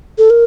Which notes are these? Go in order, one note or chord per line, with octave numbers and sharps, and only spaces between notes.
A4
A#4